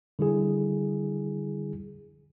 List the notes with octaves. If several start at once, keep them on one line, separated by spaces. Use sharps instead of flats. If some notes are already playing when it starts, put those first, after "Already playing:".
D3 G3 E4 G#4